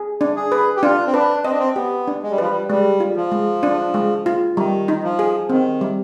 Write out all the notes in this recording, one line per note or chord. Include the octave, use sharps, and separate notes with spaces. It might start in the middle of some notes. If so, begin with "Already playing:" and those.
Already playing: G#4
D4
G#4
B4
G4
D4 F4
C4
D4 B4
C4 D#5
D4
C4
B3 G4
D4
G#3
G3
F3 B4
G3
G3 G#3
F4
F3
G#3
D4
G#3
F4
D#3 G3
D#4
F3
G#4
D#3 C4
G3